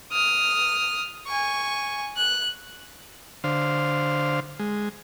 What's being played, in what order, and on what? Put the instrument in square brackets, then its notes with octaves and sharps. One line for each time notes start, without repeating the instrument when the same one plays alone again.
[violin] D#6 F6
G#5 C#6
F#6
[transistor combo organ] D3 C5 F5
G#3